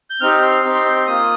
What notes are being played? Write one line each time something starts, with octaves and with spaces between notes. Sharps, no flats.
G6
C4 D#4 G4 F6
C6
C4 D#4 G4
C6
C6
C6
A#3 F4 D#6